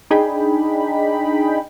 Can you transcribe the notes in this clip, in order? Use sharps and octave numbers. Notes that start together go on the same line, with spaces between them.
D4 D#4 G#4 G5 B5